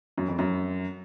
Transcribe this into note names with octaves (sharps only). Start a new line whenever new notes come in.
F#2
F2
F#2